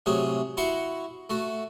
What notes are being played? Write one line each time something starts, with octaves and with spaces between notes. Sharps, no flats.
A2 C3 F#3 G#4
E4 F#4 F#5 A#5 C6 C#6
A3 F#4